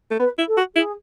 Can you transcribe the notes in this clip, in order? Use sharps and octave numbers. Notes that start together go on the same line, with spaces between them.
A3
B3 B4
E4
A4
F#4
E4 G#4